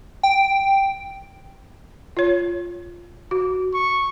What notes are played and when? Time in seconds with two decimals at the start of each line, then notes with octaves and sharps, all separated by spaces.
0.23 G5
2.17 F4 C#5
3.31 F#4
3.74 C#6